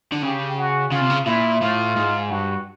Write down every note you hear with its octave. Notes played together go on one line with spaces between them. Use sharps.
D3
C#3 G4
F#4
C#3 F4
C3
C#3
A#2 E4
A2 F4
G#2
G2 F#4